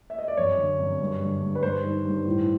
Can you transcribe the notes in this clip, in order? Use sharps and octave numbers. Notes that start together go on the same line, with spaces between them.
E5
D#5
D5
F#2 C#5
D3
F#2
G2
D3
G2
B4
G2 C5
D#3
G2
A2